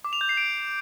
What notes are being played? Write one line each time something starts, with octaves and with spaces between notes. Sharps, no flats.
D6
F7
G6
C7
D7